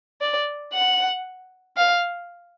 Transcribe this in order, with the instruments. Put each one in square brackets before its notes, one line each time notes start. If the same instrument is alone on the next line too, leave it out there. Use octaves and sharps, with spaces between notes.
[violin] D5
F#5
F5